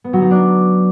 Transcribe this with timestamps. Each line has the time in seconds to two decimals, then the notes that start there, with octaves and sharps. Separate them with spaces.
0.04 B3
0.13 F#3
0.22 D#4
0.31 D4